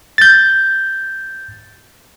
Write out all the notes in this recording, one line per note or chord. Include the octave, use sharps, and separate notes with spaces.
G6 A6